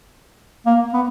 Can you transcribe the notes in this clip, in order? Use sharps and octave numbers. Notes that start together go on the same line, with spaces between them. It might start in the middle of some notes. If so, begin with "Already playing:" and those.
A#3
B3